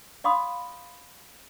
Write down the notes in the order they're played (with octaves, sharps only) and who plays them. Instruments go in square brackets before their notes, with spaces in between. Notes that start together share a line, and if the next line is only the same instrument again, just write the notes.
[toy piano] D5 F5 B5 C6 D#6